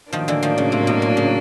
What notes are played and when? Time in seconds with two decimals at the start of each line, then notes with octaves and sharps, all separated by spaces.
0.13 A2 D#3 F3 F#3 A#3 D4
0.28 D3 E3
0.43 D#3 F3
0.58 C#3
0.72 C3
0.87 B2
1.02 A#2
1.17 C#3